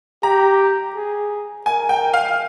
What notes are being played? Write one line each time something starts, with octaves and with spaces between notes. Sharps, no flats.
G4 A#5
G#4
A#4 G#5
G5
F5